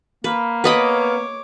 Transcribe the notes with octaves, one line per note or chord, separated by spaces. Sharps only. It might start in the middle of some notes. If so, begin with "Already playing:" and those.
A#3 B4
B3 B4 C#5 D#5 B5 D6